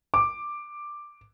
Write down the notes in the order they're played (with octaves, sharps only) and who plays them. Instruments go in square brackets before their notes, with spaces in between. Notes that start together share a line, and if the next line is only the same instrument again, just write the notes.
[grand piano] D6